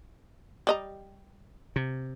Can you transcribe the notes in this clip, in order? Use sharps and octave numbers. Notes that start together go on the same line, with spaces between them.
G3 D#5 A#5
C3